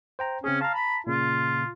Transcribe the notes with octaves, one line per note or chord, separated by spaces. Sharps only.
C5 G5 A#5
C#3 C4 C#4 G#4
F5 A5 A#5
B5
A#2 C#3 F4